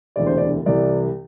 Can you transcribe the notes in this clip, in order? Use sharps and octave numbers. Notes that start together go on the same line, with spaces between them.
E1 D2 C3 E3 D5
C5
D5
C2 C3 E3 D5